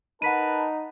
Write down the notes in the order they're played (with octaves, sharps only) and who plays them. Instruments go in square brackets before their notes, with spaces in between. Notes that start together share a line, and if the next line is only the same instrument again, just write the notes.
[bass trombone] D#4 [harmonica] A#4 B4 A5 [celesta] F#5 B6 D#7